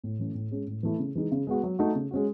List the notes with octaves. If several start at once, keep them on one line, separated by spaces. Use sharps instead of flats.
A2
E3 A3 C#4
A2
G#3 C#4
A2
E3 A3 E4
C#3
E3 G#3 D#4
C#3
G#3 B3 F#4
F#3
A3 D#4 F#4
C#3
G#3 C#4 F#4